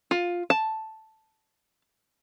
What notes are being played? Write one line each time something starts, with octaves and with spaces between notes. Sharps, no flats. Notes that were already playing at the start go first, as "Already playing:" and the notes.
F4
A5